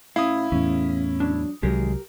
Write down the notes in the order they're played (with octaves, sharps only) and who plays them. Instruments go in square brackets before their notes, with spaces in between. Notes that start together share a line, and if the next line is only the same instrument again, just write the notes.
[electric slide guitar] A2 C#4 [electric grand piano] E4 D#6 [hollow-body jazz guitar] F5
[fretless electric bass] E2 A2 [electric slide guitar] C#4
[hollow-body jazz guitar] F#3 D4
[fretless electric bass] C2 F#3 [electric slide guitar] D#3 G#3 [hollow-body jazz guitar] G4 A#4